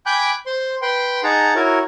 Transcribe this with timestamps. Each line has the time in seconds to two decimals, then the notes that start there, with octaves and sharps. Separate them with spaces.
0.06 G5 G#5 B5 D6 F#6 G6
0.46 C5 C6
0.82 B4 G5 C6
1.24 D#4 G#4 F#5 A5 A#5
1.55 E4 F#4 A#4 C#5